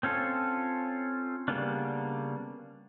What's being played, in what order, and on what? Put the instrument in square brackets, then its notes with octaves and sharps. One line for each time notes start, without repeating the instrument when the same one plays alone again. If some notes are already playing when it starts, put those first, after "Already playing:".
[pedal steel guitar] C4 C#4 F4 A4
C#3 G3 A#3 B3 D4